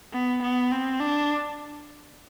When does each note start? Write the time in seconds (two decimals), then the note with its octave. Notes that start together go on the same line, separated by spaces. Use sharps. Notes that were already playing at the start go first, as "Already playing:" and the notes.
0.13 B3
0.42 B3
0.71 C4
1.00 D4